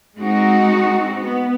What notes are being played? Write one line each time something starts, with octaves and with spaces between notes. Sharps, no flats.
G#3 C4 D#4 F#4
B3